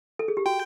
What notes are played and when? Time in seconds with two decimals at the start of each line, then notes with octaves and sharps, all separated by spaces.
0.19 A4
0.28 G#4
0.37 G4
0.46 F#4 G5